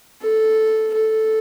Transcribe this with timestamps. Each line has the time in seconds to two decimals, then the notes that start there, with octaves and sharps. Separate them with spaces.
0.22 A4
0.94 A4